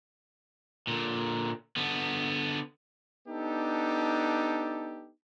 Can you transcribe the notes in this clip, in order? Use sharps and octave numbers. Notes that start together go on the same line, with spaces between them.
A#2 D3
D3 B3
B3 D4 D#4 G4 A4